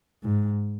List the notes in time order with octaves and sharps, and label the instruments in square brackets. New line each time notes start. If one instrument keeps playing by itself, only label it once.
[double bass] G#2